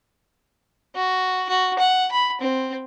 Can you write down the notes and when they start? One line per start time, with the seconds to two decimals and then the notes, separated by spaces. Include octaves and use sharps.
0.95 F#4
1.49 F#4
1.79 F#5
2.12 B5
2.41 C4